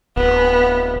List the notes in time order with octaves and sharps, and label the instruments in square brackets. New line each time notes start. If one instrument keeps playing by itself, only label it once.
[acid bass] D1 [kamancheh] B3